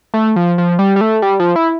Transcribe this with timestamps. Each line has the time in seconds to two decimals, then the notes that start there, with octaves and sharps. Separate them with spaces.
0.14 A3
0.36 F3
0.58 F3
0.79 G3
0.96 G3
1.01 A3
1.22 G3
1.40 F3
1.56 E4